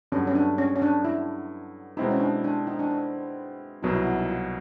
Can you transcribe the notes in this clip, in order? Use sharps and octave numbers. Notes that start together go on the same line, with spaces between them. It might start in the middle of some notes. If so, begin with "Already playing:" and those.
G2 D3 F#3 B3 C#4
C#4
D4
C#4
C#4
D4
E4
B2 G#3 C4 D#4 E4
C#4
D4
D4
D#4
D4
D4
C2 B2 F#3 B3 D#4
E4
E4
D#4
F4